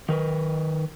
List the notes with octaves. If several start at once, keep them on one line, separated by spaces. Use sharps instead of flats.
D#3 A#4 B4